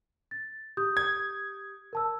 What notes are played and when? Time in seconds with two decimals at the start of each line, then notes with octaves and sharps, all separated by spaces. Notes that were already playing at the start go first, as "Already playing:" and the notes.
0.31 A6
0.77 G4 D#6 G6
0.97 G#6
1.93 A#4 A5 E6